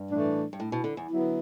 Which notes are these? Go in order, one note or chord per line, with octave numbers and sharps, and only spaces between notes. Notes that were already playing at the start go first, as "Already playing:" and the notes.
Already playing: G2
A2 E3 A3 D4
G2
A2
B2
D3
E2
D3 F#3 B3 E4